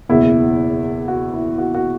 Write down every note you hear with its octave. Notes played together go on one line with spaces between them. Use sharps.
F#1 E2 B2 E4
F#4
E4
F#4
F#4